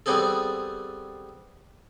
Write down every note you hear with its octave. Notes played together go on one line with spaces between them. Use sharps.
G3 B3 C4 G#4 A4